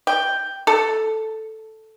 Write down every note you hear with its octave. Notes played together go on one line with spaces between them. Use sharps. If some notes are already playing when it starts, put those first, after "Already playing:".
G5
A4